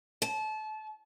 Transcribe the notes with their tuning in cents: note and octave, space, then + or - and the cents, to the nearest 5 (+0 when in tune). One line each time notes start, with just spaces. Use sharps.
A5 -30